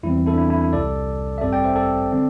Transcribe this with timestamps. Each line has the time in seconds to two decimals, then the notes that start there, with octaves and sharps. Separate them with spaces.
0.03 E2 E3 G3 C4 E4
0.26 E4 A4
0.33 D4
0.38 E4
0.50 E4
0.61 E4
0.73 C2 C3 G3 A4 D5
1.38 E5
1.41 A1 G2 G3 C4 A4 D5
1.53 D5 G5
1.64 C5 E5
1.76 A4 D5
2.12 D3 C4